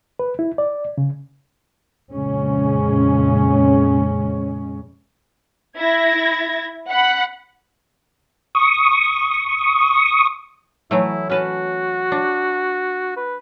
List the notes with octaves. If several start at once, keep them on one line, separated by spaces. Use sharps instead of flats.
B4
E4
D5
C#3
F2 A#2 C#3 G#3 C#4
E4 G#6 A#6
F#5 B5 F#6
C#6 D#6
E3 F#3 A3 E4
C#4 F#4 B4 A5
D4
B4